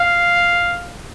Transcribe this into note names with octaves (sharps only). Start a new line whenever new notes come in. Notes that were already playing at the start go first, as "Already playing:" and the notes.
Already playing: F5